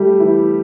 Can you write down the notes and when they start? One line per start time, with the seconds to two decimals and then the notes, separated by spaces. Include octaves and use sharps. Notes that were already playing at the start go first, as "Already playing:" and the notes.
Already playing: G3 A3 G4
0.20 E3 E4